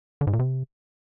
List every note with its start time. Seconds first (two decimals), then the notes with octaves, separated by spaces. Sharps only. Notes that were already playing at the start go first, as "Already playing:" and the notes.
0.21 D3
0.27 G#2
0.33 A#2
0.39 C3